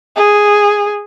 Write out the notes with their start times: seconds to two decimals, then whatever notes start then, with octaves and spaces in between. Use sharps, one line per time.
0.16 G#4